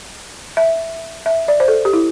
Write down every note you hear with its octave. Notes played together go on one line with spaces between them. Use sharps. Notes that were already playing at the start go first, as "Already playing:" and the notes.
E5
E5
D5
C5
A4
G4
E4